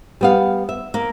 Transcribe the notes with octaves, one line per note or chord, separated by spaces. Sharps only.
G3 B3 F5
E5
A#3